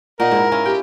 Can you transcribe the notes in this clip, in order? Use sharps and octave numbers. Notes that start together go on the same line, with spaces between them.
A#2 D#4 A#4 F#5
G#2 E4
C#4 E4 F4
G4 G5